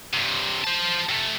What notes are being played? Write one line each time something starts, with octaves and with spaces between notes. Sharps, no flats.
G2 C3
C5 A5
C3 A3